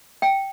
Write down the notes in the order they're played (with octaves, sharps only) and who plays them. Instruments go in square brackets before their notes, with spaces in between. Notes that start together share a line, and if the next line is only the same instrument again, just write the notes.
[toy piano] G5